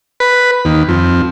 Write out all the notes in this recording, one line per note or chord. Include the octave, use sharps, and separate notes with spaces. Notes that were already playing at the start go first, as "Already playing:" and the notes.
B4
D#2
F2